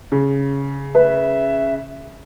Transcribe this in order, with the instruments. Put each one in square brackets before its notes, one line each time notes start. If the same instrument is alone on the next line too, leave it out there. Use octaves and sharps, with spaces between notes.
[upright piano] C#3
[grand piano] B4 [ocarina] E5